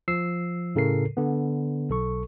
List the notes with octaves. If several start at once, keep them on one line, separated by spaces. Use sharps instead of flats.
F3 E6 C7
A2 C#3 A4 A#4 C7
D3 B3
B1 A4 C#6